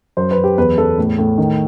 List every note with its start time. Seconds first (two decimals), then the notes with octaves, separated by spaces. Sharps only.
0.17 F#2 C5
0.31 B4
0.37 F#2
0.44 G4
0.58 E2 B4
0.78 E2 A4
0.98 A2
1.18 A2
1.38 D#3